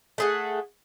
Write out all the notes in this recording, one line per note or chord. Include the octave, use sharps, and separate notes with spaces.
A3 G#4 F#5